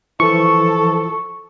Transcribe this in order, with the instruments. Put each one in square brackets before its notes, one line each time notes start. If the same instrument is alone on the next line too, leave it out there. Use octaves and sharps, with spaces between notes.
[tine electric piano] E3 F3 E4 [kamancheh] A4 [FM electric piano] C#6